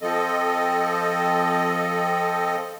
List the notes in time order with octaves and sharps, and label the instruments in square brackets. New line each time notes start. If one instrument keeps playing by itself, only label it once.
[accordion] F3 C4 A4 D#5